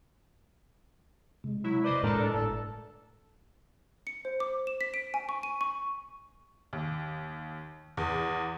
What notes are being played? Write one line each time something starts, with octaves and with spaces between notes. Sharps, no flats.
C3 G#3
F#3 E4
B4 C5 D5 D#5
A2 G#3 D4 A4 A#4 D5 A#5
G1 A2 A4
C#7
C5
D6
E7
B6
D7
G#5
C#6
D#7
C#6
D#2
E2